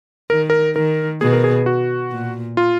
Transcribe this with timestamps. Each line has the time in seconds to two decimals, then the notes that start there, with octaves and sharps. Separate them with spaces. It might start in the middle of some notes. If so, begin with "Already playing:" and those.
0.30 D#3 A#4
0.50 A#4
0.75 D#3 A#4
1.21 B2 G#4
1.33 A#4
1.44 G#4
1.66 F#4
2.11 A#2
2.57 F4